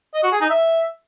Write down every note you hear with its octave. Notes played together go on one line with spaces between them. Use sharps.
D#5
F#4
G#4
D#4
E5